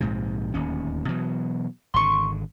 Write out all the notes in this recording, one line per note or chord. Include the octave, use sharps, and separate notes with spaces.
A#1 G#2 C3
D1 D#2 C#4
B2 E3 F#3
G#1 D3 C6 C#6